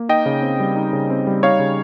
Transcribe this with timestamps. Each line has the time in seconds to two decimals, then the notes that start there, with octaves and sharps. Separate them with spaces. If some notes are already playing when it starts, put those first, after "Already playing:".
Already playing: A#3
0.09 D#4 D#5 G5
0.26 C#3
0.42 C4
0.60 G3
0.76 D#4
0.93 C#3
1.10 C4
1.27 G3
1.43 D#4 C#5 F5
1.59 C#3